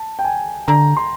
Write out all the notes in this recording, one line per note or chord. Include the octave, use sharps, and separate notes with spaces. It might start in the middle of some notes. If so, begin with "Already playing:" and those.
Already playing: A5
G5
G#5
D3 A#5
C6